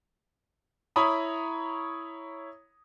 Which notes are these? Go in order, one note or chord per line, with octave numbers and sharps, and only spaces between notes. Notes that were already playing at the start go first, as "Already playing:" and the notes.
E4 C#5 A#5 B5 D#6